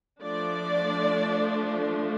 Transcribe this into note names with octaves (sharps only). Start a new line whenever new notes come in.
F3 A3 D4 D5